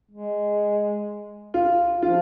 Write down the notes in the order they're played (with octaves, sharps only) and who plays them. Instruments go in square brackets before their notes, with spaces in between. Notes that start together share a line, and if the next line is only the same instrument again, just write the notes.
[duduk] G#3
[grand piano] F4
[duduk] F3 [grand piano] F4